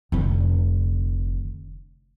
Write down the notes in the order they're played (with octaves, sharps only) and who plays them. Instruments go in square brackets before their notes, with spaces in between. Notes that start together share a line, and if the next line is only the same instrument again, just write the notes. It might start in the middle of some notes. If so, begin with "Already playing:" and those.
[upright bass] F1 D3